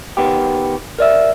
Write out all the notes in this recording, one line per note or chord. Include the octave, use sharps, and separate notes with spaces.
D#3 B3 G4
A#4 D5 E5